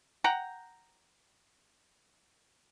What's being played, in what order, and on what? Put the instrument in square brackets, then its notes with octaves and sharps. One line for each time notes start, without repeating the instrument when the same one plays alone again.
[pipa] F#5 G5 A#5